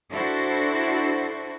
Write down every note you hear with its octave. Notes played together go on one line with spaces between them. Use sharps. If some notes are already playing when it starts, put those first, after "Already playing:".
D4 E4 F#4 A4 C5